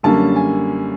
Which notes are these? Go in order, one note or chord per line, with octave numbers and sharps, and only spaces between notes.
F#2 D3 G3 A#3 C#4 A5
G#5